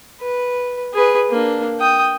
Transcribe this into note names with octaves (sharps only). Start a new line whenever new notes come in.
B4
G#4 B4
A#3 D4
G5 D#6